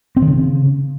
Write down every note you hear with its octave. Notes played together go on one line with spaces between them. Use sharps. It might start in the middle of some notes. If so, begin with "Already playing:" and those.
C4
D#3
C#3